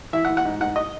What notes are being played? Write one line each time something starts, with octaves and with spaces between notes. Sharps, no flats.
E3 E5
F#5
E3
F#5
G#2
G#2 F#5
D#5